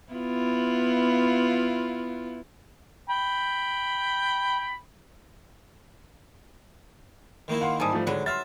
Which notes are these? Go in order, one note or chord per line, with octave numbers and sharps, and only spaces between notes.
B3 E4 F4
G5 B5
D#3 A#3 E4
F5 F#5 C6
G#2 G3 G#5 A5 D#6
F3 A3
D3 F#3 G#3 B4
E5 C6 F6 A6